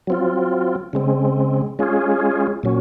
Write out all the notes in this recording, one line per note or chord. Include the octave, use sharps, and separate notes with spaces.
F#3 C4 F4
C#3 G#3 C4
G#3 C#4 F4 G#4
A#2 F#3 C#4